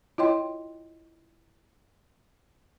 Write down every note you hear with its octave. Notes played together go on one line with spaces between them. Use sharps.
E4 F4 C#5 D#5 G5 C6